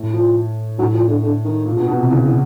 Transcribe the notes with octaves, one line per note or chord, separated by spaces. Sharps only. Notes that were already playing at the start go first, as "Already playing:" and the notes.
Already playing: A2
F3
A2 F#3
F3
D3
D3
D#3
A#2
B2
B2
C3
C#3 E3
E3